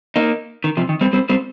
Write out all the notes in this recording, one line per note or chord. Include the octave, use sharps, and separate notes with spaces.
A#3 D#4
D#3
C3 F3
D#3
G3 C4
G3 C4
G3 C4